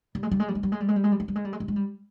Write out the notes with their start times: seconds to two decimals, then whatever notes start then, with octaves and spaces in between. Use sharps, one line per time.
0.15 G3
0.23 G#3
0.31 G3
0.40 G#3
0.48 G3
0.55 G#3
0.63 G3
0.72 G#3
0.80 G3
0.88 G#3
0.96 G3
1.04 G#3
1.12 G3
1.20 G#3
1.28 G3
1.36 G#3
1.45 G3
1.53 G#3
1.60 G3
1.68 G#3
1.76 G3